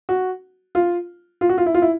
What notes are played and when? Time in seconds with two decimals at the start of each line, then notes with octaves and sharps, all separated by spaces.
0.09 F#4
0.75 F4
1.41 F4
1.49 F#4
1.58 F4
1.66 E4
1.74 F4
1.82 E4